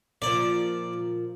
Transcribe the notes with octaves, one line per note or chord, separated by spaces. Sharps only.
A#2 F3 D5